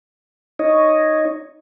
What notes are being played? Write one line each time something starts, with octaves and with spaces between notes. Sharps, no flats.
D#4 C#5 D#5